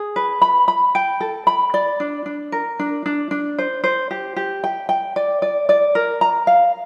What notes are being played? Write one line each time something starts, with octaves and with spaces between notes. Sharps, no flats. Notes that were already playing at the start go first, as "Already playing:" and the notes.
Already playing: G#4
B4
B5
B5
G5
A4
B5
D5
D4
D4
A#4
D4
D4
D4
C5
C5
G4
G4
G5
G5
D5
D5
D5
A#4
A#5
F5